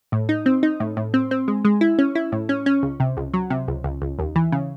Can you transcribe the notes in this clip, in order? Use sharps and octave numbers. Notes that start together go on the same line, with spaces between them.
A2
D#4
C4
D#4
A2
A2
C4
C4
G#3
G#3
E4
C#4
E4
A2
C#4
C#4
C#2
C3
C#2
F#3
C3
C#2
C#2
C#2
D#2
E3
C#3